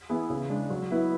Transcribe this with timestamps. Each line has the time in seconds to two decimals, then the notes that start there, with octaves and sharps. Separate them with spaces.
0.09 E3 B3 E4 G#4
0.30 C#3
0.49 G#3 D4
0.70 F#3
0.91 B3 E4 B4